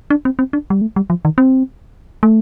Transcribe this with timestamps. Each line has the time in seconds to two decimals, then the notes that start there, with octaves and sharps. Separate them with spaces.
0.10 D4
0.25 C4
0.39 C4
0.53 D4
0.70 G3
0.81 A3
0.96 G3
1.10 F3
1.25 D#3
1.38 C4
2.23 A3